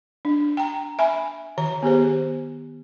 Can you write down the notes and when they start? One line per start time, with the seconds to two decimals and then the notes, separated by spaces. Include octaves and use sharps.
0.25 D4
0.57 G5 A#5
0.99 E5 G#5 B5
1.58 D#3 A#5
1.83 B3 G4 G#4 C5